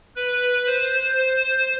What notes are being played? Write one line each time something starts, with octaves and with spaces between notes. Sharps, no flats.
B4
C5
C5